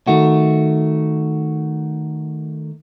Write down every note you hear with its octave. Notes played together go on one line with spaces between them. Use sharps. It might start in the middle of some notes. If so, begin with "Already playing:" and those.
D#3 A3 F#4